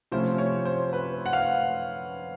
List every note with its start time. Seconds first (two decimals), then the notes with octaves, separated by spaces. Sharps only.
0.12 C3 F3 A3 C#4 E4 C5
0.38 C#5
0.65 C5
0.93 B4
1.26 F#5
1.33 F5